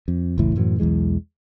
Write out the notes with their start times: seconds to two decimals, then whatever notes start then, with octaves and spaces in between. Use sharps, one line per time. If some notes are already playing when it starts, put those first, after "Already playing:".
0.08 F2
0.38 F#1 C#2 A2 E3
0.55 F#2 A2 E3 F#3
0.80 B1 E2 E3 G#3